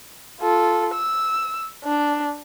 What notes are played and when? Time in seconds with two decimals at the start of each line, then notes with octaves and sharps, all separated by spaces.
0.41 F4 A4
0.94 E6
1.84 D4